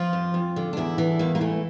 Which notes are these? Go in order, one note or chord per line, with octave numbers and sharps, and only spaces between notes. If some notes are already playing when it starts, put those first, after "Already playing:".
Already playing: F3 F4
F2
F2
D3
D4
E2 E4
E3 D4
E2 A#3
A#3
E3 A3